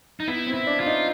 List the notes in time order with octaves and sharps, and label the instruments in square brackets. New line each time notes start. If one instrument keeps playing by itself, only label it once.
[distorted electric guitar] D#4
[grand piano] B3 [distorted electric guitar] E4
[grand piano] C4
[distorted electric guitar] E4
[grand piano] D4
[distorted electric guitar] F4
[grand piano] D#4